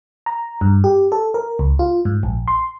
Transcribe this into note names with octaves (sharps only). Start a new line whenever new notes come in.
A#5
G2
G4
A4
A#4
C#2
F4
G#2
A#1
C6